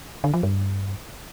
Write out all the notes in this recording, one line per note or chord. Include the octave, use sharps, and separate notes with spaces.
D3
F3
G2